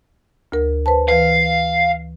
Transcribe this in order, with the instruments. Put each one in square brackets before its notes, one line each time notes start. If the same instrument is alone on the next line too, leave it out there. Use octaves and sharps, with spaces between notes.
[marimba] D2 A#4
B4 C5 A5
[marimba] E3 B4 [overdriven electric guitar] F5